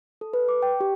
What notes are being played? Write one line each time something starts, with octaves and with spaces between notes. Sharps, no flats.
A4
B4
D6
G5
G4